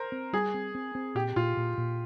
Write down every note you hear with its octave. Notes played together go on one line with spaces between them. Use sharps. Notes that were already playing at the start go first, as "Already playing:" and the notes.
Already playing: A#4 C5
C4
G3 G#4
C4
C4
C4
A#2 G4
A#2 F4
A#2
A#2